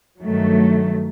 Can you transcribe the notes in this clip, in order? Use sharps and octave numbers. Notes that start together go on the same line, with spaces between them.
G2 D#3 F#3 A3